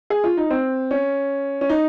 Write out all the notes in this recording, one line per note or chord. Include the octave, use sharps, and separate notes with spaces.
G#4
F4
D#4
C4
C#4
C#4
D#4